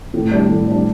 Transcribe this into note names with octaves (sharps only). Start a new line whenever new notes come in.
A2
G3 D4
A2
G3 D4